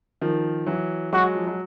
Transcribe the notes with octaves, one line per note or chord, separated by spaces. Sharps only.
D#3 F3
E3 F#3
F#3 G#3 F#4
F3
F#3